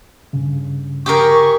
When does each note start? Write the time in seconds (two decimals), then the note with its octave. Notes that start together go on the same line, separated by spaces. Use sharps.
0.33 G2 C#3
1.06 G4 G#4 A#4 C#6